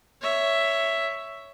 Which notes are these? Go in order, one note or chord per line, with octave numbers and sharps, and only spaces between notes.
C#5 E5